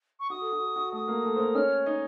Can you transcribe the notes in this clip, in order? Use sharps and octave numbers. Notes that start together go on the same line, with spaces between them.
C#6
F#4 D#6
A4
F#4
A4
F#4
A3 A4 D#6
A#3 A#4
A3 A4
C5
A#3 A#4
C#4 C#5 F6
D#4 D#5